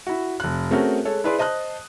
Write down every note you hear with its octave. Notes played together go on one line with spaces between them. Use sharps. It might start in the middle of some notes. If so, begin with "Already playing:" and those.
E4 F#4
F1 F#6
A3 C4 C#4 F#4 G#4 A#4
G#3 A4 C#5
E4 G#4 B4 D5 C6
C5 D#5 A5 D#6 F#6